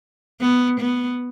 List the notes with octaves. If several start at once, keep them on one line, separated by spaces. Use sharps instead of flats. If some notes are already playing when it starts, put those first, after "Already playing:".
B3
B3